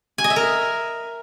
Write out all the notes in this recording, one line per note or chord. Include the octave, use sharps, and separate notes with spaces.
G#5
D#5
E5
A#4